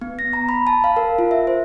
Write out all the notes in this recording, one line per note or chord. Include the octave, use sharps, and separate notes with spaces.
B3
A#6
A#5
B5
A5
F5
A#4
F4
E5
C5